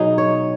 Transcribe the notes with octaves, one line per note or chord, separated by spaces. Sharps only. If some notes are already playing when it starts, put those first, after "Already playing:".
Already playing: B2 F#3 D#4 G#4
C#5